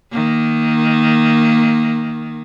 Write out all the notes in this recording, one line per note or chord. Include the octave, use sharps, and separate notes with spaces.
D#3 A#3